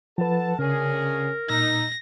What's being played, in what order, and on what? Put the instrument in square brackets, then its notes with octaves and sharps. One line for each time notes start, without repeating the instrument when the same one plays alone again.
[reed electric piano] F3 B4 [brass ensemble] A4 F#5 A5
[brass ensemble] D2 C#4 G#4 [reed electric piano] C#3 [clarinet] A#4
[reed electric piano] A#2 E6 [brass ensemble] D#4 [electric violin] A#6